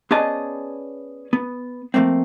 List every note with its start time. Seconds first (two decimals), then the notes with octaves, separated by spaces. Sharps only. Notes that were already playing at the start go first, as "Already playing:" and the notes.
0.11 B3 C#4 G#4 D5 D#5 A5
1.33 B3
1.94 F3 F#3 A3 A#3 C4